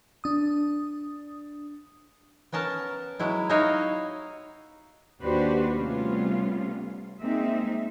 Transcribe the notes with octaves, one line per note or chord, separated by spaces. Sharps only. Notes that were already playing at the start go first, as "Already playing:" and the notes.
D4 D#6
B3 C#4 A#4 A5
F#3 G#3 E4
D#4 E4 F#4 C#5 D#5 F5
D#2 D4 F#4 G4 B4 C5
C3 G3 A3 B3 C#4 F4
G#3 A#3 C4 D#4 E5